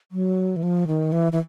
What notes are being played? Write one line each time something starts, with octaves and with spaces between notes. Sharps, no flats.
F#3
E3
F3
D#3
E3
E3